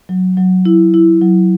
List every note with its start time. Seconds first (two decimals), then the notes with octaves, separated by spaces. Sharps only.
0.09 F#3
0.37 F#3
0.65 E4
0.94 E4
1.21 F#3